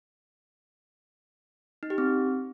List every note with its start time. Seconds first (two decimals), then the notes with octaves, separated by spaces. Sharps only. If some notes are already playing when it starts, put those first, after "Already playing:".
1.83 D#4
1.90 G4
1.98 C4